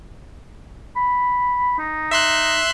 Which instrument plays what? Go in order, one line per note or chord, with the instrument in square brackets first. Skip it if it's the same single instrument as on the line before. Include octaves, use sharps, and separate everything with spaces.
[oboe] B5
D#4
[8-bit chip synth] E5 C6 F#6